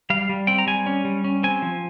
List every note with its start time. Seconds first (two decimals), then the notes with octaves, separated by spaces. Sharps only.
0.10 G3 F5
0.29 G3
0.47 C4 G5
0.59 A#5
0.67 G3 G#5
0.86 C#4
1.05 G3
1.24 C#4
1.43 C4 G#5
1.62 F3